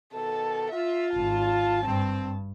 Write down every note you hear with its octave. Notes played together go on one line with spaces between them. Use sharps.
B2 D#3 A4 A5
F4 E5
G#1 A5
G2 C4